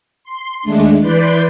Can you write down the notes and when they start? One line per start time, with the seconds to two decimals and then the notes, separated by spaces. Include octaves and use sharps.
0.24 C6
0.63 D#2 G#3 A3 D4
1.00 E3 B4 D5 C6 G6